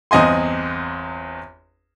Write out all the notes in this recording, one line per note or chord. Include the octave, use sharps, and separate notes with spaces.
G1 E2 C4 D#5 G#5 C6